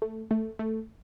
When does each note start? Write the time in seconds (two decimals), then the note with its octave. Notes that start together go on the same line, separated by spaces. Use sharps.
0.02 A3
0.31 A3
0.59 A3